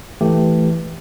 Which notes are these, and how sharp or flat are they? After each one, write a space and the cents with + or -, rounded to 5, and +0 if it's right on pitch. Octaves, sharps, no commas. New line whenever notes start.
E3 +0 A3 +0 G4 +0